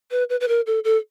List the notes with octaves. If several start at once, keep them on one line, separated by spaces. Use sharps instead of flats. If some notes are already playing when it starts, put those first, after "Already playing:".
B4
B4
B4
A#4
A4
A4